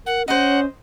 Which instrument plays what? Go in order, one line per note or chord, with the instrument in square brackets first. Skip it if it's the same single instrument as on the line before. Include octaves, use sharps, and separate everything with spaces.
[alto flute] A#4 [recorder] F#5
[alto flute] C#4 [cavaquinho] C5 D#5 [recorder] F#5